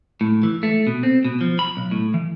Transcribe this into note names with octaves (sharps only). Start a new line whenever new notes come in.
A2
E3
A3
B2
C4
B2
F3
B5
B1
A2
E3